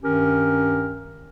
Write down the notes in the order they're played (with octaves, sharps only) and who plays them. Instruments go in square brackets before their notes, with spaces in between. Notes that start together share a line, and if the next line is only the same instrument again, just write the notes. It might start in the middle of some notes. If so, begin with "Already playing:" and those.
[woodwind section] G2 D#3 C#4 G4 A#4